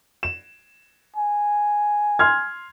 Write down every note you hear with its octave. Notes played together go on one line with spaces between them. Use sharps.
E7
G#5
C6 F6 G#6